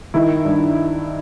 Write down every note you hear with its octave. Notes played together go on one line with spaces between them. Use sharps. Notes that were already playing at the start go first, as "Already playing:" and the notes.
D#3 E4
G2